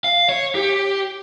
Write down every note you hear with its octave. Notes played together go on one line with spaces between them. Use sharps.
F5
C#5
G4